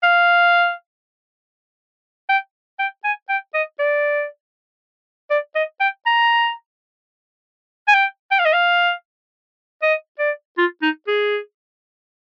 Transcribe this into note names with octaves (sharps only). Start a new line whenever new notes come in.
F5
G5
G5
G#5
G5
D#5
D5
D5
D#5
G5
A#5
G#5
G5
G5
F5
D#5
F5
D#5
D5
F4
D#4
G#4